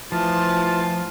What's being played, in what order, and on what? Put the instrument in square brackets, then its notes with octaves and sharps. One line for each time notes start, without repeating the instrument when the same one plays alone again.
[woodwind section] E3 A3 F4 [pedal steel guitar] F3 [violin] A5